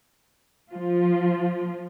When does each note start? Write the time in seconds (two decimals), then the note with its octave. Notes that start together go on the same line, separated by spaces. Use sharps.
0.71 F3 F4